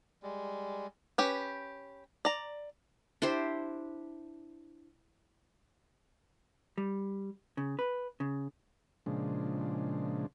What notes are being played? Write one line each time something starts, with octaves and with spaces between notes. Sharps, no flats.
G3 G#3
C#4 G4 B4
D5 A#5
D4 E4 G4 C5
G3
C#3
B4
C#3
A#2 C#3 F3 G#3 D4